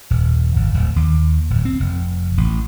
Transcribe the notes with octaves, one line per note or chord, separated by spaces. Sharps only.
D#1
G#1
D1
D#2
D1
C4
F1
A1